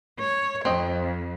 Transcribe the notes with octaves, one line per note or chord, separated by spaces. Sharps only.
C#5
F2 C4 D#5